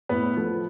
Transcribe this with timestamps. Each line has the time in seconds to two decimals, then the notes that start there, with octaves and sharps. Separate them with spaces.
0.09 A2 B3 B4
0.37 F3 A3